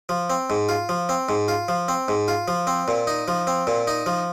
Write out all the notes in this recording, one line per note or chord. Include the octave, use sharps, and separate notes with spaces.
F3
C4
G#2
F4
F3
C4
G#2
F4
F3
C4
G#2
F4
F3
C4
A#2
D#4
F3
C4
A#2
D#4
F3